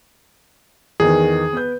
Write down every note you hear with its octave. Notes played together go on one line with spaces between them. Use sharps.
E2 D#3 B3 G#4
B3 B4 G6